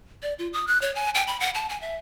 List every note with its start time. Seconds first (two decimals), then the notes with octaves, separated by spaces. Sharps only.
0.23 D5
0.39 F4
0.53 D#6
0.67 F#6
0.82 C#5
0.95 G#5
1.15 G5
1.27 B5
1.40 F#5
1.54 A5
1.69 G#5
1.81 E5